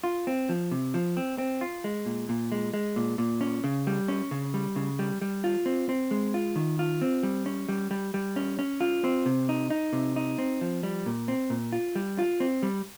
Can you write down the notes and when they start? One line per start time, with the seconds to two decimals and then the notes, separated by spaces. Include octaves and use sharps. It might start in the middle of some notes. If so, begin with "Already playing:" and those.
0.04 F4
0.27 C4
0.49 F3
0.71 C3
0.94 F3
1.17 C4
1.38 C4
1.61 F4
1.84 G#3
2.06 A#2
2.29 A#2
2.52 G#3
2.74 G#3
2.96 A#2
3.18 A#2
3.41 C#4
3.64 C#3
3.87 G3
4.08 C#4
4.31 C#3
4.54 G3
4.76 C#3
4.99 G3
5.22 G3
5.44 F4
5.66 C4
5.89 C4
6.11 G#3
6.34 F4
6.56 D#3
6.79 F4
7.02 C4
7.23 G3
7.46 C#4
7.69 G3
7.91 G3
8.14 G3
8.36 C#4
8.59 C#4
8.81 F4
9.04 C4
9.26 C3
9.49 D#4
9.70 D#4
9.93 C3
10.16 D#4
10.38 C4
10.61 F3
10.83 G3
11.06 A#2
11.28 C4
11.50 A#2
11.72 F4
11.95 G3
12.19 F4
12.40 C4
12.63 G3